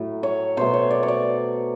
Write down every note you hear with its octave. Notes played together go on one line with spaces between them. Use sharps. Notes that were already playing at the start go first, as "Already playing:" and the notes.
Already playing: A2 F#3 A3
C#5
B2 F#3 A3 C5
C#5
D5
C#5
D5